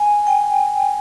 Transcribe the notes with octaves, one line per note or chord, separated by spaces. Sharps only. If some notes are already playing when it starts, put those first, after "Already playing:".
Already playing: G#5
G5